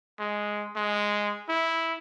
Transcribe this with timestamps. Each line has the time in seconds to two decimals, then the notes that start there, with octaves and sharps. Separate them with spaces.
0.19 G#3
0.76 G#3
1.49 E4